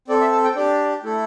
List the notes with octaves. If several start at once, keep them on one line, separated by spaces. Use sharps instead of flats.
C4 A4 D5
E5
A5
G5
D4 G4 D5
A3 E4 A4